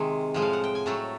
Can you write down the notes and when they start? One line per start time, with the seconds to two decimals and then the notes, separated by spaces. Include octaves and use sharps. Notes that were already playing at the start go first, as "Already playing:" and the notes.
Already playing: C3 D#3 G#3 G#5
0.34 A2 F3 G#3
0.42 F5
0.53 F#5
0.64 G5
0.75 G#5
0.86 A2 F#3 A3 A5